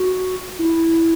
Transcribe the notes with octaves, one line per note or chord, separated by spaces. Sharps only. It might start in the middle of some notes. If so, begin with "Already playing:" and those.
Already playing: F#4
E4